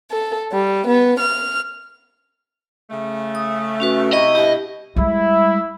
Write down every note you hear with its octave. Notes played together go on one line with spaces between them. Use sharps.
A4
G3
B3
F6
C#3 A3
D#6
C#4 F#4 B4
C3 E4 D#5 C#6
G2 B2 E4 G4
G3 G#3 E4